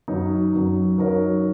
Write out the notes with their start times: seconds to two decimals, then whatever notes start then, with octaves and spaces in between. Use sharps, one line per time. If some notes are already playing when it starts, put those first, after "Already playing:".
0.08 F#2 F#3 D#4
0.54 F#2 F#3 D#4
0.98 F#3 D#4 A#4 C#5